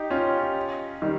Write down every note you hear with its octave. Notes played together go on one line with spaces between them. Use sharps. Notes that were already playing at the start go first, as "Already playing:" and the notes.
Already playing: D#4 G4
C#4 F4
D#3 G3